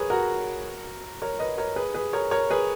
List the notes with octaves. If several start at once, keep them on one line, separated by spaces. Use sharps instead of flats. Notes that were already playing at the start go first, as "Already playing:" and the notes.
Already playing: G#4 A#4 B4 C#5
F#4 A#4
A#4 C#5
B4 D#5
A#4 C#5
G#4 B4
G#4 B4
A#4 C#5
A#4 C#5
G#4 B4